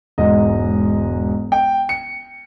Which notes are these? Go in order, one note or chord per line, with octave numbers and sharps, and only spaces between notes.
E1 G#2 D#5
G5
C#7